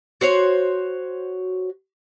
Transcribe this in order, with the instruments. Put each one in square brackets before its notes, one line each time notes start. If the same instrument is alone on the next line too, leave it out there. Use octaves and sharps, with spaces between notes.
[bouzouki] F#4 C5 C#5